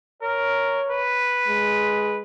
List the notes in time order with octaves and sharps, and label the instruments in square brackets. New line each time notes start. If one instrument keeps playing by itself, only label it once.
[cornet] A#4 [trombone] C#5
[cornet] B4
[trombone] G#3